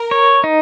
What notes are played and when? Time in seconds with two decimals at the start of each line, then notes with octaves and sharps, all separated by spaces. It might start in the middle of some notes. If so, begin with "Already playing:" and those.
Already playing: A#4
0.11 C#5
0.44 D#4